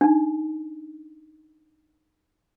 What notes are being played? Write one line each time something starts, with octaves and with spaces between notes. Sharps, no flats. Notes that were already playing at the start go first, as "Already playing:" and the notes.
D4 D#4